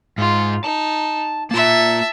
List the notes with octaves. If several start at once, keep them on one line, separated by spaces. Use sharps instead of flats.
G#2 F4
D#4 A5
A#3 F4 E5 A5